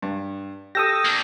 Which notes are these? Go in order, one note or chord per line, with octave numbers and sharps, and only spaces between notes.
G2
G4 A4 D#6 E6 G6 A#6 D#7
A#3 D4